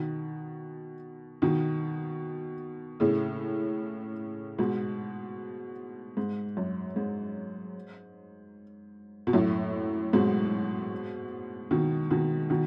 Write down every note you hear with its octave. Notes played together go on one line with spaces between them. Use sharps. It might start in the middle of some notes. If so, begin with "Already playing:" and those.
Already playing: B2 D#3
B2 D#3
A2 C#3
G#2 B2
G#2
F#2
G#2
B2
F#2 A2
G#2 B2
B2 D#3
B2 D#3
B2 D#3